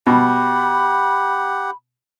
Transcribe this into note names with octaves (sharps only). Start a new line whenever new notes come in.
B2 G4 F#5 B5